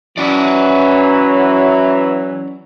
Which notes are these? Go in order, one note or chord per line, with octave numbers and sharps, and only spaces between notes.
E3 F#3 C#4 D5